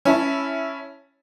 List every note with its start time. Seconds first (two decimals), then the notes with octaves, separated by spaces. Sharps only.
0.05 C#4 E4 A5